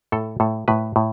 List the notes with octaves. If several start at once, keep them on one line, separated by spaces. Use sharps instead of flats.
A2 A4
A2 A4
A2 B4
A2